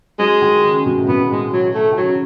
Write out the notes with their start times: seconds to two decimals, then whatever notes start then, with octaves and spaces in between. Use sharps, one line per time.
0.19 F#3 G#3
0.42 D#3
0.64 C#3
0.86 B2
0.98 A2
1.08 B2 B3
1.30 G#3
1.53 F#3
1.74 A3
1.92 D#3
1.97 C#3 F#3